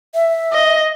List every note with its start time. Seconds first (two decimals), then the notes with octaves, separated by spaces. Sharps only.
0.15 E5
0.53 D#5